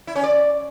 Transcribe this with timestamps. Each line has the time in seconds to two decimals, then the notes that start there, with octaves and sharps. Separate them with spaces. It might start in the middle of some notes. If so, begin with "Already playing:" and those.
0.07 E4
0.15 C#4
0.23 D5